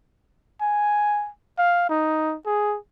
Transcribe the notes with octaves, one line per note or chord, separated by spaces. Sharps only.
G#5
F5
D#4
G#4